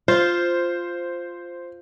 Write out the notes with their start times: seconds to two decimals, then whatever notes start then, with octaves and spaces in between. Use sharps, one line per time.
0.08 F4 C5